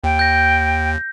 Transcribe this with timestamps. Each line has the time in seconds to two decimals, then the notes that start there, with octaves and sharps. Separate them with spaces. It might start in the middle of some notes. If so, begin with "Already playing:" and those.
0.04 D#2 G5
0.19 G6 A#6